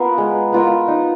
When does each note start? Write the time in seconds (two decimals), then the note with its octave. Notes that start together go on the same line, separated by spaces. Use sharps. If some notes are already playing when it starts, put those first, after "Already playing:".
Already playing: B3 F4 A#4
0.18 G#3
0.52 B3 F4 A#4
0.88 D#4